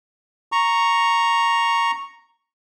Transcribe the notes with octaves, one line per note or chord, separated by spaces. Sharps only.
A#5 C#6